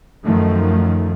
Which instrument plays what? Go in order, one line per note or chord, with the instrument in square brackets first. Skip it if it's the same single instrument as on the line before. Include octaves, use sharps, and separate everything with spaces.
[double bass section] F#2 D#3 F3 A3